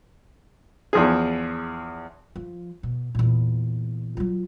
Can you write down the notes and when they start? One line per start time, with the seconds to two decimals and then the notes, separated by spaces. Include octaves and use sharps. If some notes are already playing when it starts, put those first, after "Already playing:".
0.93 E2 F3 G#4
2.36 F3
2.83 B2
3.15 E2 A#2
4.17 F#3 F4